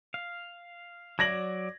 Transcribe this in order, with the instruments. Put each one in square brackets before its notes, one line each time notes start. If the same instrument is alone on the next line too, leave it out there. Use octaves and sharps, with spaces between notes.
[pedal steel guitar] F5
[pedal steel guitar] F#3 D5 [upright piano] G#6 A#6 F#7